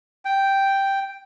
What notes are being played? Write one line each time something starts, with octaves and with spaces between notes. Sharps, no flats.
G5